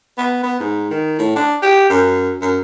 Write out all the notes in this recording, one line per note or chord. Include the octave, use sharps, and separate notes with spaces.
B3
B3
G#2
D#3
A2
D4
G4
F#2
F#2